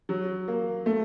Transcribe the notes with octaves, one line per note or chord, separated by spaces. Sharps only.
F#3
A#3
A3